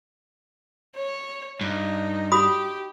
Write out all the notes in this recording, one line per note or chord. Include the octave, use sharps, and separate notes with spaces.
C#5
G2 D#4
F#4 G4 B5 D#6